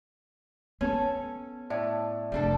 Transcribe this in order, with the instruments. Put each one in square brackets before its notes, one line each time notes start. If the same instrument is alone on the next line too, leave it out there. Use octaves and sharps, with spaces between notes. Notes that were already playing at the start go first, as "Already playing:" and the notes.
[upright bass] B3 [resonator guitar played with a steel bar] C#4 A4
[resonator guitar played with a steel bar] A2 [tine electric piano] D5 E5
[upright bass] F1 [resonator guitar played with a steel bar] G3 D4 A4